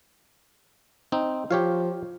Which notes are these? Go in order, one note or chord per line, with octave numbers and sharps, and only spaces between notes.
C4 D#4
F3 G4 C#5 F5